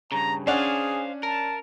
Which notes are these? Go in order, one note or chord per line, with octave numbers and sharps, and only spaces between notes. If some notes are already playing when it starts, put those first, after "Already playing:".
G2 C#3 A#5
C#4 D4 G#4 C5 F5 F#5
A#4 A5